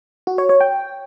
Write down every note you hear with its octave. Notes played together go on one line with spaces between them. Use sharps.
F#4
C#5
C#5
G5